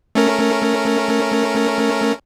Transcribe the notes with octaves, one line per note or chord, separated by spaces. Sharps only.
A3 C#4 A#4